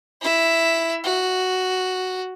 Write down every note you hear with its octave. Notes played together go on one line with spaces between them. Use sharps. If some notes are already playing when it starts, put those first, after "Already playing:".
E4 E5
F#4